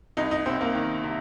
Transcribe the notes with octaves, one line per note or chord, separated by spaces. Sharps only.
C2 D#4
D#4
C2 C4
A#3
D#3
C3